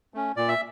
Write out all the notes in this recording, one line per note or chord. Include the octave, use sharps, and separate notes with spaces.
A3 C#4
A#2 D5
E5